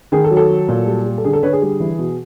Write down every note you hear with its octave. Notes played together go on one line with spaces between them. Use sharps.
D#3 G#4
A4
F#3
A4
F#3
A#2
G3
G3
A4
D3 G#4
A4
D3 B4 C#5
G#4
G3
E3
B2